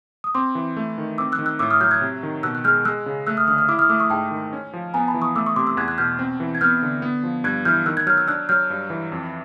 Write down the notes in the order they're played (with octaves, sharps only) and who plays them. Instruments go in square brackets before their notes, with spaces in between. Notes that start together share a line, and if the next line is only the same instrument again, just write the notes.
[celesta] D#6
[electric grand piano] C4 [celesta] C6 D6
[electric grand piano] E3
A3
D#3
[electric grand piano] C4 [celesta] D6 E6
[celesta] E6 F#6
[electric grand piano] D#3
[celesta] E6 F#6
[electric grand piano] A2 [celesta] D6 E6
[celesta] D#6 F6
[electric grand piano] F#3 [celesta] F6 G6
[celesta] F#6 G#6
[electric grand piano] C3
D#3
[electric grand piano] B2 [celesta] E6 F#6
[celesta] F#6
[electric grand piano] G#3 [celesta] F6 G6
[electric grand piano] G#3 [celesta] E6 F#6
[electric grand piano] C#3
[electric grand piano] A3 [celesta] E6 F#6
[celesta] D#6 F6
[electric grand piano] D3 [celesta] D#6 F6
[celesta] D#6 F6
[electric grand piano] E4 [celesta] D6 E6
[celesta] D#6 F6
[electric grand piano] A3 [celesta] D6 E6
[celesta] C#6 D#6
[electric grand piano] G#2 [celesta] G5 A5
[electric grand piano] D#3
C#4
F3
[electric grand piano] B3 [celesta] G#5 A#5
[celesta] A5 B5
[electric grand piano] E3
[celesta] C#6 D#6
[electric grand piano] A3 [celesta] D6 E6
[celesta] C#6 D#6
[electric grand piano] C3 [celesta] C6 D6
[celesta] D6 E6
[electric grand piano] E2 [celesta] F#6 G#6
[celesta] F#6 G#6
[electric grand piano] B2 [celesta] F6 G6
[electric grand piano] C4
E3
[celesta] G#6
[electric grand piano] B3 [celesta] F6 G6
[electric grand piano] D3
B3
F3
[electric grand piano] G2 [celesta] F#6 G#6
[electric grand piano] E3 [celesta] F6 G6
[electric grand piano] D#3 [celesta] E6 F#6
[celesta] F#6 G#6
[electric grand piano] F#3 [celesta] F6 G6
[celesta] E6 F#6
[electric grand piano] D4 [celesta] E6 F#6
[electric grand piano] F#3 [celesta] F6 G6
[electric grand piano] G2
E3
F2